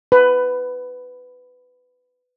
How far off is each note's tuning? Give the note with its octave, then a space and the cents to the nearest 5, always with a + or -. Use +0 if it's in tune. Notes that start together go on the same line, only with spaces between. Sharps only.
B4 +15